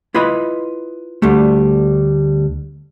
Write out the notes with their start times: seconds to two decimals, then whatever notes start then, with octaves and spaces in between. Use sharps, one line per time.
0.14 E4 F4 B4 D#5 B5
1.22 D2 D3 G3 A3